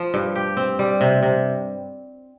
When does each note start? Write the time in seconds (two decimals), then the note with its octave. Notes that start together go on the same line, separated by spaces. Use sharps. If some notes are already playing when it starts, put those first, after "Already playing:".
Already playing: F3
0.14 G2
0.36 G4
0.57 C4
0.79 G3
1.01 C3
1.23 C3